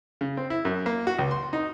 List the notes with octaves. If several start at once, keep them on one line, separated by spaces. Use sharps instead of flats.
C#3
C4
E4
F#2
A#3
F#4
C#2
C6
D#4